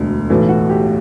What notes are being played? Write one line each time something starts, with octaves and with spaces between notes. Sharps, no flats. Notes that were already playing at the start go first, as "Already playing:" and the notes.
Already playing: E1 D2 D3
B1 A2 E3 A4
F#4
G4